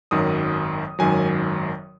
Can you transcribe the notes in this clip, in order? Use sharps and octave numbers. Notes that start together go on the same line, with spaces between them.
G#1 F#2 D#3 F#3 D#6
G#1 F#2 D#3 F#3 G#5